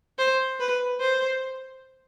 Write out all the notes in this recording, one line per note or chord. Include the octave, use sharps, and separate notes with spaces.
C5
B4
C5